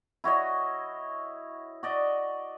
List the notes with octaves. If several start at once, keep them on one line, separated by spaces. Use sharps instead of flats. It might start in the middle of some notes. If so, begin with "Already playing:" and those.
E4 F#4 C#5 D#5
F#4 D5 D#5